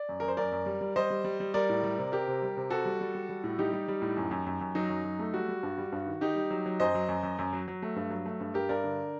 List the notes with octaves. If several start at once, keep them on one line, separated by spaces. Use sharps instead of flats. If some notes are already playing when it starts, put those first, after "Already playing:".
Already playing: D5
F#2
F#2 A#4
C5
F#2 A#4 D5
F#2
G3
G3
G3 C5 D#5
G3
G3
G3
G3 A#4 D5
A2
G3
C3
C3 G4 A#4
C3
G3
C3
C3 F#4 A4
G3
G3
G3
G3
A2
G3 D#4 G4
G3
G3
A2
F#2
F#2
F#2
F#2
F#3 D#4
F#2
F#3
A3
G3 F#4
G3
G2
G3
G2
D#3
D#3 D#4 G4
G3
F#3
F#3
F#2 C5 D#5
F#3
F#2
F#2
F#2
F#3
F#3
A3
G2
F#3
A3
G2
G2 G4 A#4
G2 A#4 D5
D3